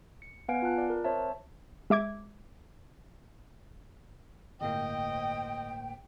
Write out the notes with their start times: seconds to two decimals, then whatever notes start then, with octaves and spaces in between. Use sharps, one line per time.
0.22 C#7
0.48 B3 B4 F5 F#5 G#5 D7
0.62 F4 A5 F#6
0.78 D5
0.90 A#4
1.04 C4 C5 C#5 E5 A5
1.90 G#3 E5 D6 G#6
4.61 G1 A2 A#3 C5 D#5 G5